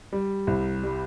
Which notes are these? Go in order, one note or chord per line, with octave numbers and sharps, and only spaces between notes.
G3
C2
G3